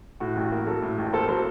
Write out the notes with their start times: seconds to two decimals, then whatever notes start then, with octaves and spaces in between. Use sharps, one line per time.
0.20 A2 F#4
0.36 A1
0.52 A#3
0.67 F#3 A4
0.82 A2
0.98 A1
1.13 A#3 A4 C5
1.28 F#3 A4 C5